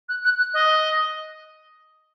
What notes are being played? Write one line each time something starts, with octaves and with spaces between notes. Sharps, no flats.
F#6
F#6
F#6
D#5